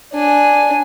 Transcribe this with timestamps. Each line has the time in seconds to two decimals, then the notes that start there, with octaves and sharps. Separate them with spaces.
0.14 D4 G#5